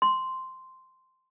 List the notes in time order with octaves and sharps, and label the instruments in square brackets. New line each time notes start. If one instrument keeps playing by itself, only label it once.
[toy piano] C6